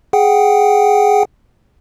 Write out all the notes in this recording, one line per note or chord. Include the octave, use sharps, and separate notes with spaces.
G#4 F#5 G5